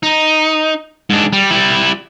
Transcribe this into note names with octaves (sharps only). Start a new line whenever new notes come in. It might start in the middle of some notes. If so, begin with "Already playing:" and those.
D#4
G#2 D4
G3
G3 E4